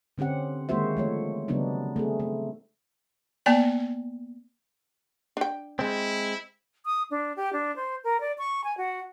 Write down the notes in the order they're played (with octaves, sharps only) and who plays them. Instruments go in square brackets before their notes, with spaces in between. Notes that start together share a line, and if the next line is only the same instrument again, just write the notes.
[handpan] D3 C4 C#4 G4 F#5
D#3 G#3 A#3 F#4 C5 E5
F3 A3 C#5
C#3 F#3 G3 B3 D4 D#4
A3 C4 G#4
A3
[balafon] A#3 B3 D5 A5
[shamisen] D4 G5
[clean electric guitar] G#3 C4 [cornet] E4
[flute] D#6
D4
G4
D4
C5
A#4
D5
C#6
G#5
F#4